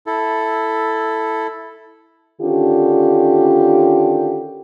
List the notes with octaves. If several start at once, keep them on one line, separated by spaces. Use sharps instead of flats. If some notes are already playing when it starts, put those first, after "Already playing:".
E4 A4
D3 D#3 C#4 D4 F4 G4